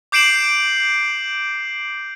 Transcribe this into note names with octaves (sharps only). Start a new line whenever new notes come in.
D6 G6 C7 D7 E7 F#7